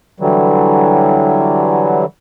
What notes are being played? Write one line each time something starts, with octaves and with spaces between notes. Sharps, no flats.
D3 E3 F#3 G3